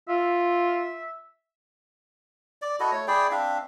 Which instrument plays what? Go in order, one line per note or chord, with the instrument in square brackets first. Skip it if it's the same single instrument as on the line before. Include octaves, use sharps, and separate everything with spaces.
[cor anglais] F4 [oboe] E5
[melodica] D5
E4 F#4 A4 D#5
A3 C#5
E4 G#4 D5 G5
C4 D4 E5 F5